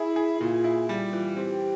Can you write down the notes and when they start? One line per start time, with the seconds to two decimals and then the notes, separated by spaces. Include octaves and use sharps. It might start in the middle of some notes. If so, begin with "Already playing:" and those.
Already playing: E4 G#4
0.16 G#4
0.41 A#2 F4
0.64 E4
0.89 G3 F4
1.13 E3
1.36 C4 G4